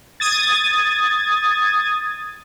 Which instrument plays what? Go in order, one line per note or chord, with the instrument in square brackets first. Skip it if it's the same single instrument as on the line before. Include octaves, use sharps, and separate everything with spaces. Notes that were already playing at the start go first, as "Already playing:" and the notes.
[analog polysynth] D#6 G#6 A6